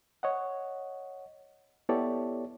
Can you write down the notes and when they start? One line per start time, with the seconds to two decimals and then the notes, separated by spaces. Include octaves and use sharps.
0.23 C#5 D#5 F#5
1.89 B3 E4 G4 A4 C#5 D5